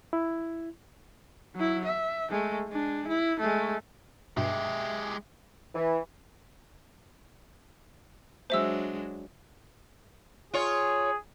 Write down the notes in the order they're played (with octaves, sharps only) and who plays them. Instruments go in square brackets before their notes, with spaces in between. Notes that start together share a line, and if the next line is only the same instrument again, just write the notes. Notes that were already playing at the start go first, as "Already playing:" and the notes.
[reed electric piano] E4
[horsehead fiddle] F#3 E4
E5
G#3 A3
G#3 D4
E4
G#3 A3
[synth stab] G2 B2 [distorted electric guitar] G#3 G4 [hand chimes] E5
[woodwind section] E3
[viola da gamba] F#3 G#3 D4 [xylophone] C5 E5 E6
[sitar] F4 C#5 [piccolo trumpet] G#4